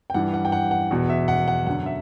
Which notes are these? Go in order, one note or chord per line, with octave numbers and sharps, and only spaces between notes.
G5
G2 E3 F#5
F#5
G5
F#5
F#5
E2 B2
E5
F#5
F#5
F#2 D3 F#5
E5